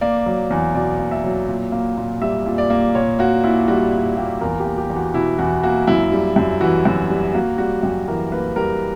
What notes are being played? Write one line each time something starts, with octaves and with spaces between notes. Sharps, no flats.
A#3 D5
F#3
E2
B2 D5
A#3
E5
F#3
A#2
A#3
A#2
G3 E5
A#2
D5
A#3
A#2 C#5
A#3 F#4
A#2 E4
G3 F#4
A#2
A#3 G4
E2 A#4
G4
A#3
G4
E2
F#4
B2 E4
E2 F#4
A#3 F#4
F#2 E4
G3
F#2
E3 F#4
F#2
G3
A#3 F#4
G3 F#4
F#2 G4
E3 A#4
A#3 B4
G3 A#4